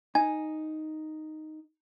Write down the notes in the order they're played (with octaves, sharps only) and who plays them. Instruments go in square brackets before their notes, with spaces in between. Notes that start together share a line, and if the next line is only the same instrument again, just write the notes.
[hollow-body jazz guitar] D#4 [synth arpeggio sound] G#5